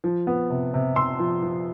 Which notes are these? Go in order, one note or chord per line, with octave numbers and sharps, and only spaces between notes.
F3
B3
C3
C3
C3 C6 E6
F3
F3